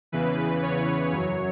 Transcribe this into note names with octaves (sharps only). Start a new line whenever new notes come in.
E2 C#3 E3 B4
C#5
F#2 F#3 C#5